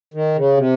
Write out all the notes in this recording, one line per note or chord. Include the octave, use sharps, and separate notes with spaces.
D#3
C#3
C3